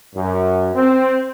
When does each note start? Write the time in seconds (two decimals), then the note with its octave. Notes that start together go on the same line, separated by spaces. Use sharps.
0.15 F#2
0.74 C4